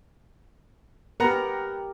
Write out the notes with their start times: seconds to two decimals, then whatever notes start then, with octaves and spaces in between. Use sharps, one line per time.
1.20 B3 G4 A#4 F#5 A#5